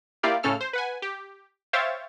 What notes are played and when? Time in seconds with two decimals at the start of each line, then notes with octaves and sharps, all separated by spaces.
0.23 A#3 E4 F4 G4 D5 F5
0.43 A2 C#3 C#4 A4 F6
0.61 C5
0.73 B4 F#5 G#5
1.02 G4
1.73 C5 C#5 E5 F5 G5 A6